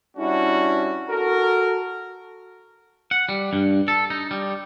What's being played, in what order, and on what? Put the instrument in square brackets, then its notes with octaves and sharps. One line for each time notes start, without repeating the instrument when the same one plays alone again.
[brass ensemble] G3 C#4 D4 E4 F#4
F#4 A4 A#4
[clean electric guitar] F#5
G3
G2
A4
D#4
G3